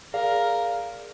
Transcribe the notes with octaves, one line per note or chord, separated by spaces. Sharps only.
G#4 A#4 D5 F5